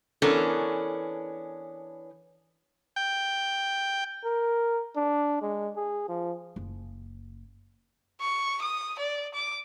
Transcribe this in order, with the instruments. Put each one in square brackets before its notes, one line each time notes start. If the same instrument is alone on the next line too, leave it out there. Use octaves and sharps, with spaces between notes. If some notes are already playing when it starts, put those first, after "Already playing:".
[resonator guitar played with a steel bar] E3 B3 C#4 D4 A4 A#4
[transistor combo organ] G5
[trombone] A#4
D4
G#3
G#4
F3
[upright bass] F#1
[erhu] C#6
D#6
D5
D6